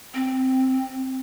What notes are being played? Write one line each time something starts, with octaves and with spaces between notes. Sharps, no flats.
C4